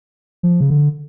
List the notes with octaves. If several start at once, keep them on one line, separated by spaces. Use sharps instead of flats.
F3
C#3
D3